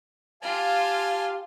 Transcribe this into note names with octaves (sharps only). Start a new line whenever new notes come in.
F4 G4 F5 G#5 A5